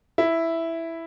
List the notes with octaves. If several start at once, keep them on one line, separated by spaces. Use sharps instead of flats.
E4